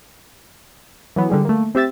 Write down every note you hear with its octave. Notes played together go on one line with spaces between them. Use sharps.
E3 F#3 B3
D3 G3 G#3
A3 A#3
C4 G4 E5 A6